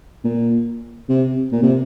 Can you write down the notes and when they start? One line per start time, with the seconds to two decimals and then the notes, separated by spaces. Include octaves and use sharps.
0.24 A#2
1.09 C3
1.52 A#2
1.63 C3